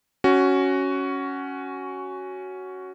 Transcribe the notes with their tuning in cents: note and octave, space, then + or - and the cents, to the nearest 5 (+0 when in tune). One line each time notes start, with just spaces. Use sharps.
C#4 +0 F#4 +10